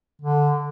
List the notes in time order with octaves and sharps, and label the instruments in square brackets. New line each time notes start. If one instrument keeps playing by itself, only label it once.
[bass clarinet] D3